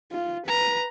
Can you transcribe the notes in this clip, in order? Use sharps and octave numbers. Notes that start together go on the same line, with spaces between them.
F4
B4 A#5